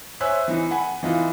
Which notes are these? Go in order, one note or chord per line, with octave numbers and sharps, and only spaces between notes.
C5 C#5 E5 G#5 E6 F#6
E3 D#4
F#5 G#5 B5
E3 D#4 F4